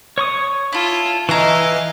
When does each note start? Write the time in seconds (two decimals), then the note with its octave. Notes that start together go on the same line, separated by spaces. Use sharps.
0.18 C#5 C#6 D#6
0.73 E4 F4 A4
1.29 E3 A3 E4 G#4 D#5 F5 A#5